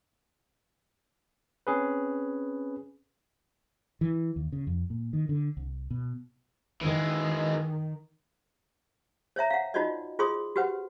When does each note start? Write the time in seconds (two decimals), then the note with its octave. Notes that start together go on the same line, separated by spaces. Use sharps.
1.67 C4 C#4 G#4 B4
4.01 E3
4.36 D#2
4.52 C#3
4.67 F2
4.90 A#2
5.13 D#3
5.29 D3
5.57 C2
5.90 B2
6.81 D#3 E3 G#3
9.36 C5 C#5 E5 A#5
9.50 F5 F#5
9.74 D#4 F4 F#4 C5 D5 D#5
10.19 F4 G#4 C5 C6 D#6
10.56 F#4 G4 B4 C5 F#5